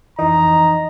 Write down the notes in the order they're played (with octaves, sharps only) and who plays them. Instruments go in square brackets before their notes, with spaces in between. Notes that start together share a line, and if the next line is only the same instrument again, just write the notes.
[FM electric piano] F2 E3 [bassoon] D#4 [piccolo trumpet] A#5